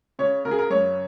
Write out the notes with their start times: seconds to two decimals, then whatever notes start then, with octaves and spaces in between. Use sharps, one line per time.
0.19 C#3 C#5
0.45 C#3 A#4
0.51 G#4
0.59 A#4
0.70 F#2 C#5